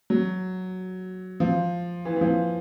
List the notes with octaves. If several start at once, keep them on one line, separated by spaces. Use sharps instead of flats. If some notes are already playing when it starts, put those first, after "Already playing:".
F#3
F3
E3
E3
F3